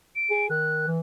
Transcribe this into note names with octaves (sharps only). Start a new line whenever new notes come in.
D7
G#4
D#3 F#6
E3